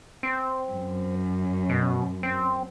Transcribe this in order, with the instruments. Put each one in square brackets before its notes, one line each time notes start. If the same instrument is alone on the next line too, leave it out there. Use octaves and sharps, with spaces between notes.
[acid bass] C4
[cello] F#2
[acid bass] B2
C4